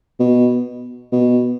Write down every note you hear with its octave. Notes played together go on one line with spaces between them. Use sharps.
B2
B2